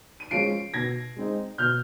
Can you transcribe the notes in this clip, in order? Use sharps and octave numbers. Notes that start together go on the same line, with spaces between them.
D#7
F3 G#3 C#4 C7 D7
B2 G#6 A#6
G#3 C4 D#4
B2 F6 G6